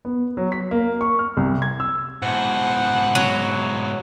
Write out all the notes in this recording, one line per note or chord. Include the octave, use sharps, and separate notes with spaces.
B3
F#3
B6
A#3
C#6
F6
C2
G#6
E6
G#2 B2 E3 C5 F#5
F#3